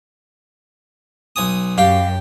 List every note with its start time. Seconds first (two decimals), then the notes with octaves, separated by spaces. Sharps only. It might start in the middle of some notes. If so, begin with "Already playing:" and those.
1.36 B1 G#5 D#6
1.78 F#2 G4 F5